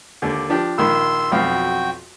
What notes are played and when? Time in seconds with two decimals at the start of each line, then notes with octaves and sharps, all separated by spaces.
0.22 D#2 D3
0.49 F3 D4 G4
0.78 A#1 D#3 C6 E6
1.31 B1 F2 F#4 F5 G5